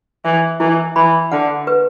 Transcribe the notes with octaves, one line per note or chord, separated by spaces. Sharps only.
E3 E5
E3 E4
E3 B5
D3 F#5
B4